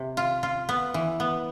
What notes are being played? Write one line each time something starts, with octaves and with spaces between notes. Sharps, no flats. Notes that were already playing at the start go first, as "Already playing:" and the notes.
Already playing: C3
F4
F4
B3
E3
B3